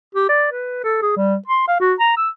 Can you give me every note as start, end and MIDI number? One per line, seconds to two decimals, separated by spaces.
0.15 0.27 67
0.29 0.48 74
0.52 0.78 71
0.84 0.97 69
1.02 1.15 68
1.16 1.35 55
1.47 1.63 84
1.68 1.77 77
1.80 1.94 66
2.00 2.16 82
2.17 2.29 88